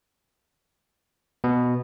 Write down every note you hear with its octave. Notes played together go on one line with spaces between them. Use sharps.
B2